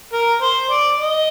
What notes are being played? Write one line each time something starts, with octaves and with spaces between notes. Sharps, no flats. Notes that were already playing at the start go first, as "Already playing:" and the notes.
A#4
C5
D5
D#5